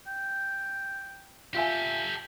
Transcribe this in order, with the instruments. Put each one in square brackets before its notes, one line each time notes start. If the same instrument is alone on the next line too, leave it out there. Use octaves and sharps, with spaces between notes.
[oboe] G5
[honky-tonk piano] F4 E5 G#5 [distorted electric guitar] G4 A4 [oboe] G5